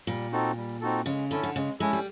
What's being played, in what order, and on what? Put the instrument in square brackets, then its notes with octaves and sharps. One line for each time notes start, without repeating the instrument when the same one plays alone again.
[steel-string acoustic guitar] A#2 [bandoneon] G3
[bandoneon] C4 D#4 F#4 A4
G3
C4 D#4 F#4 A4
[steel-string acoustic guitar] C#3 [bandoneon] G#3
[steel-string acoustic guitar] D3 [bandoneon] C#4 E4 A4
[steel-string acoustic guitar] D3
[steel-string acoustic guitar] C#3 [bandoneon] G#3
[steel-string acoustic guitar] G#3 [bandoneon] C#4 E4 A4
[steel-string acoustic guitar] G3